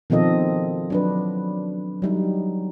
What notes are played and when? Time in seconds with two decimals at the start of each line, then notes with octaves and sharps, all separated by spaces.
0.10 B2 D#3 F3 C4 A4 D#5
0.90 F#3 D4 B4
2.02 F#3 G3 D#4